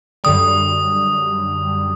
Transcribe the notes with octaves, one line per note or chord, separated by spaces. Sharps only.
F#2 D3 G3 D#6